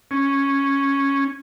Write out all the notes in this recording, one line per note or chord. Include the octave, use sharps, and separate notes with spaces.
C#4